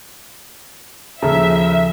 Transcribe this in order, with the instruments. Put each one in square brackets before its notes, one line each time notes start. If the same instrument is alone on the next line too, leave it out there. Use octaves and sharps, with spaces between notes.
[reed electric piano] D#2 A4 A#5 [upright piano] C#3 [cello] F3 [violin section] E5